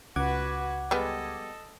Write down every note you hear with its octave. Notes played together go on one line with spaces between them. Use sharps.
C#2 F#4 B4 F#5 D6 G#6
G3 G#3 B3 A4 D#5